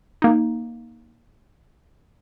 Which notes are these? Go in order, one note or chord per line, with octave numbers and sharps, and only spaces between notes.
A#3 D#4